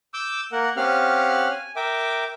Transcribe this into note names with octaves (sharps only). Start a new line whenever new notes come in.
D6 E6 G6
A#3 A#4 F#5
C4 C#4 G4 F5 F#5 F6
G#5
A#4 E5 G5 D6